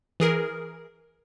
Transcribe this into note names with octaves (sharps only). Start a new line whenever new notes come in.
E3 G#4 A#4